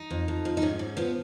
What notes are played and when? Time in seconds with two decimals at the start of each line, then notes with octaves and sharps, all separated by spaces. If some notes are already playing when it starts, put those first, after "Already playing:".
Already playing: D#4
0.10 F2
0.28 F2
0.45 F3
0.57 D#4
0.62 G#2 C#4
0.79 G#2
0.97 F3 B3